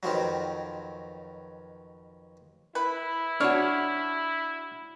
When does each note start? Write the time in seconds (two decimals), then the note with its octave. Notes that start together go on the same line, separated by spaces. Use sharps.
0.03 F2 B2 D#3 F3 F#3
2.75 E4 B4
3.41 D4 F#4 C#5 F6